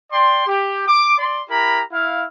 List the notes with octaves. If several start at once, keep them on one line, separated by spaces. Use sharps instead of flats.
D5 G5 C6
G4
D6
D5 C6
E4 G4 A#4 A#5 B5
E4 F5